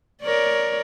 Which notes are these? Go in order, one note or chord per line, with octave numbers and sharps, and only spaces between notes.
A#4 C#5 D5